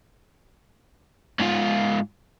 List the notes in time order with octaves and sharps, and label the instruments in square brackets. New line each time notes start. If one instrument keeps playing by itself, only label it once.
[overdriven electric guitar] G#2 F4